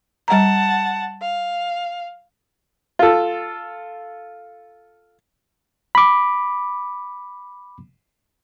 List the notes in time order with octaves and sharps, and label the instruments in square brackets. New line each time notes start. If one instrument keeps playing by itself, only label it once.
[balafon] G3 A#5 [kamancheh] F#5 A5
[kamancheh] F5
[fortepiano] F4 A4
[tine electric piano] B5 D6